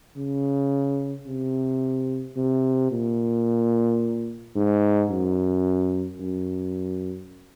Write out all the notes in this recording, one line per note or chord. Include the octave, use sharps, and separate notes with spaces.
C#3
C3
C3
A#2
G#2
F#2
F#2